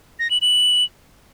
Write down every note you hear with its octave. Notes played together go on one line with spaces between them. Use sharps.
A#6
F#7
F#7